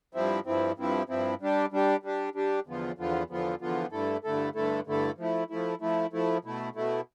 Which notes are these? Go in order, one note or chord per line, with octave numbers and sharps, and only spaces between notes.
G2 F3 C4 E4
G2 F3 C4 E4
G2 F3 C4 E4
G2 F3 C4 E4
G3 D4 G4
G3 D4 G4
G3 D4 G4
G3 D4 G4
E2 D3 F3 B3 F4
E2 D3 F3 B3 F4
E2 D3 F3 B3 F4
E2 D3 F3 B3 F4
G2 D3 A3 E4 A4
G2 D3 A3 E4 A4
G2 D3 A3 E4 A4
G2 D3 A3 E4 A4
F3 A3 E4
F3 A3 E4
F3 A3 E4
F3 A3 E4
B2 A3 E4
B2 A3 E4